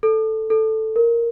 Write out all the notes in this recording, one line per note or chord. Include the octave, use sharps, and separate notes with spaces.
A4
A4
A#4